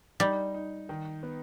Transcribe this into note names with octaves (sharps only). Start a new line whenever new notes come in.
G3 D#4
D#4
D#3
B3